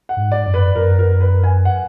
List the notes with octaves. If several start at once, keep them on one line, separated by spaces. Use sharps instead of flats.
F#5
G#2
D5
F#2
B4
F#2 A#4
A#4
B4
G#5
F#5